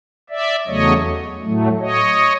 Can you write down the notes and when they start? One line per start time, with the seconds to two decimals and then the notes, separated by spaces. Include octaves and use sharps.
0.29 D5 E5
0.66 E2 C#3 F#3 A3 C#5 D#5
1.42 A2 F#3 A3
1.80 C#5 D#5